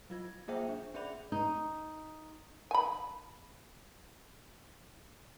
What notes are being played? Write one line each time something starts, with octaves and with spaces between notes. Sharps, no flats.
F#3 F4 G#6
A#3 F4 G#4 C5 E5 G5
D4
C#4 G#4 D5 E5 B5 F7
D#4
G#5 B5